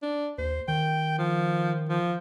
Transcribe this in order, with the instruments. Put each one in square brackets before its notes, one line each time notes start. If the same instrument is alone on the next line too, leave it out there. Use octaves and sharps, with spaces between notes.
[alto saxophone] D4
[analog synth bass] D#2 [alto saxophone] C5
[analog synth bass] D#3 [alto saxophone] G5
[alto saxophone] F3
F3